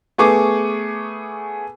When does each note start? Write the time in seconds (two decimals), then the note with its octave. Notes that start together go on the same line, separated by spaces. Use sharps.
0.18 A3 B3 G#4 C#6 D6